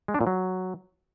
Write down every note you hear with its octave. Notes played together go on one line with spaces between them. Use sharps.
G#3
D4
A#2
F#3